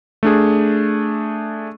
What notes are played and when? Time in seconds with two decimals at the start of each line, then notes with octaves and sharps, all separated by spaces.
0.23 A3 D4 G#4